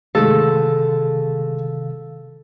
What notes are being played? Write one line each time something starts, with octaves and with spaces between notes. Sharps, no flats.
C3 D#3 G#3 A3 A4 F5